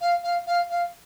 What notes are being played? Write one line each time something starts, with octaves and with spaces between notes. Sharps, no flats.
F5
F5
F5
F5